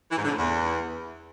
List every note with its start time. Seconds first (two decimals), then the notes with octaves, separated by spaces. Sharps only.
0.11 E3
0.18 G#2
0.25 D3
0.31 A2
0.38 E2